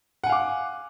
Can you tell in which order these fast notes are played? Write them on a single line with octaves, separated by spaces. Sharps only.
F#5 G#5 F5 D6